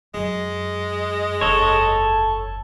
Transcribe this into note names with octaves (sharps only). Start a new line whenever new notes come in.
F#2 G#3
F#1 E2 A4 C#5 A5